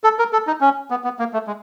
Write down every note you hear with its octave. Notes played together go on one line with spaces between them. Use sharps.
A4
A#4
A4
D#4
C#4
B3
B3
A#3
A3
G#3